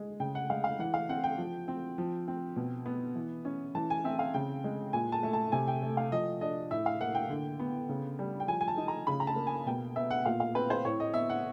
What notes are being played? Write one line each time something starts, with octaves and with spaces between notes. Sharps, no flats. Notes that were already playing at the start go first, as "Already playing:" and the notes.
Already playing: G#3
C#3 G5
F#5
G#3 F5
F5
E3 F#5
F5
C4 F#5
G5
F3
C4
F3
C4
B2
B3
E3
C#4
E3 A5
G#5
C4 E5
F5
C#3 G5
G#3
A#2 G#5
A5
A3
A5
C3 G#5
G5
A3
F5
F3 D#5
D4 D#5
A2 E5
F5
A#3 F#5
G5
D3
B3
C#3
G3
G5
F3 G#5
G#5
A5
D#4
A#5
C#3 B5
A#5
A5
A#3
G#5
B2 G5
B3 E5
F#5
A#2 F5
F5
C4 B4
C5
A2 C#5
D#5
B3 E5
F#5